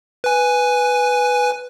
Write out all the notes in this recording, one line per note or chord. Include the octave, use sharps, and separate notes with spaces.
B4 G#5